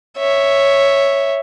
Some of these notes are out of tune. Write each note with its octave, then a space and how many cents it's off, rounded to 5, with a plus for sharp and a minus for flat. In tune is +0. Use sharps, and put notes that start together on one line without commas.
C#5 +0 E5 +0